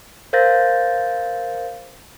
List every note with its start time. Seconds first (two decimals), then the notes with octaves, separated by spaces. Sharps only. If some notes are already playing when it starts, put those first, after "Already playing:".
0.33 A#4 C5 F5 G6 A6 A#6